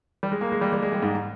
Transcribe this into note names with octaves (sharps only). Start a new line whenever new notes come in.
G3
G#3
A#3
G#3
G3
G3
G#3
G3
G#2